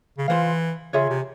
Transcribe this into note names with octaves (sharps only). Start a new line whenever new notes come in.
C#3
E3 F4 C5 F5
C#3 F4 G#4 C#5 E5
C3